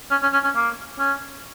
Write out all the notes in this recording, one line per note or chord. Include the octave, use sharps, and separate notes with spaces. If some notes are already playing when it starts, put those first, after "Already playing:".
C#4
C#4
C#4
C#4
A#3
C#4